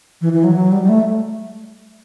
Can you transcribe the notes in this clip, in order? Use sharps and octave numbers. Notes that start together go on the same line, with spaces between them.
E3
E3
F#3
F#3
G3
G3
A3